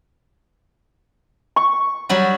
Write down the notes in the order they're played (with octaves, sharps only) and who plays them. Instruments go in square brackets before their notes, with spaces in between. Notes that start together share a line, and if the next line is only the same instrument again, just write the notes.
[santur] C#6
[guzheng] F#3 G3 F#4